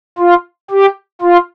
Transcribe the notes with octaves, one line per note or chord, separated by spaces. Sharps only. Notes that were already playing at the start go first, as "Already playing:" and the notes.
F4
G4
F4